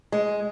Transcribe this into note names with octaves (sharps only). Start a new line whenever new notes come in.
G#3